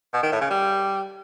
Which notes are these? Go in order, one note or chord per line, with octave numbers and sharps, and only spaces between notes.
B2
D#3
A2
C#3
G3